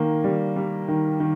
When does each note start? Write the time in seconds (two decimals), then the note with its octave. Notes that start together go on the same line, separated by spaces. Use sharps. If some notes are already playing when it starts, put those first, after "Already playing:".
Already playing: D#3 A#3
0.24 G3
0.56 G3
0.88 D#3
1.20 D#3